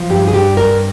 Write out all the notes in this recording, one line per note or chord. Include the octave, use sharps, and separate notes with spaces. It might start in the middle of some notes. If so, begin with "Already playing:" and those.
Already playing: F3
G2 G4
G#4
G2 G4
G2 A#4